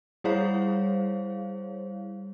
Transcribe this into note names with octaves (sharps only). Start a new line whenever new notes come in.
G3 E4 G#4 C5 C#5 F5